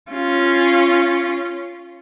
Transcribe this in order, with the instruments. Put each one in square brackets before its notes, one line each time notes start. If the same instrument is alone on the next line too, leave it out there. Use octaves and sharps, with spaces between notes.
[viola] C#4 F4